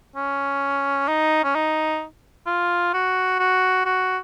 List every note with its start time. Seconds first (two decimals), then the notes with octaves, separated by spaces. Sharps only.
0.16 C#4
1.08 D#4
1.44 C#4
1.55 D#4
2.47 F4
2.94 F#4
3.39 F#4
3.85 F#4